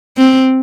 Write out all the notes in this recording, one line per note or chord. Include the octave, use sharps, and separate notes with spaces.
C4